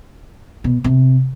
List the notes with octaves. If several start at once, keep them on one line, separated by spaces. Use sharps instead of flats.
B2
C3